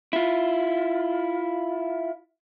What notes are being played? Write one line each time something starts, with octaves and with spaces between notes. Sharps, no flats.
E4 F4